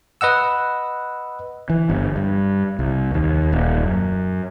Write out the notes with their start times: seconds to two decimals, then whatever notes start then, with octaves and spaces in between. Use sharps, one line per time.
0.21 B4 D#5 F#5 E6
1.70 E3
1.89 G1
2.16 G2
2.79 C2
3.14 D#2
3.53 D#1
3.84 F#2